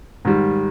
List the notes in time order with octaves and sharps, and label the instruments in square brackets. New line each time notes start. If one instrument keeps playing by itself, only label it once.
[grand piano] G#2 D#3 G3